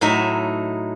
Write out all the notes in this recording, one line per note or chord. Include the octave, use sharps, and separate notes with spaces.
A2 F#3 D#4 E5